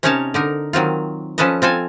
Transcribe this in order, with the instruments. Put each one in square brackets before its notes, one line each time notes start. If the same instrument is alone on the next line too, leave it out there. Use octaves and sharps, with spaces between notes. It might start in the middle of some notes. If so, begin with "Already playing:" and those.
[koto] C3 C#4 D#4 A#4 C#5 A5
D3 D#4 A#4
D#3 F#3 C4 F4
F3 C#4 A4 B4 D#5
C4 F4 A4 G#5